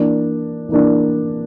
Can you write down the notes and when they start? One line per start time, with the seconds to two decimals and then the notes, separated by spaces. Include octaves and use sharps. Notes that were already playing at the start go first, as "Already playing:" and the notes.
Already playing: E3 A#3 D4
0.69 E3 A#3 D4